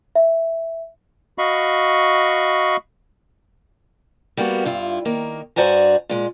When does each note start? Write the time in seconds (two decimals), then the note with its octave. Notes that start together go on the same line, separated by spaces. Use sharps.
0.15 E5
1.38 F#4 D#5 F5 B5 C#6
4.37 G3 A#3 B3 F#4
4.65 G2 E4 F4
5.05 D#3 A#3
5.56 G2 F#4 C5 D5 G#5 A#5
6.09 A#2 G#3